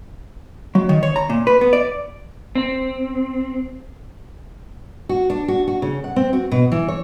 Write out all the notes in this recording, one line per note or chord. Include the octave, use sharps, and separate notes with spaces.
F#3
D#3
C#5
A#5
A#2
B4
B3
D5
C4
F#4
D4
F#4
F#4
C#3
F#5
C4
F#4
B2
E3
C#5